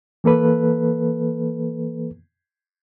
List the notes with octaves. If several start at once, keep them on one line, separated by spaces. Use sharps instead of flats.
E3 A#3 A4 B4